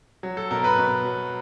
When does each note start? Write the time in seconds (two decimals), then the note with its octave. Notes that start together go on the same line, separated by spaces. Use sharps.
0.23 F#3
0.37 A4
0.51 B2 A#4
0.64 B4
0.77 B2
1.05 F#3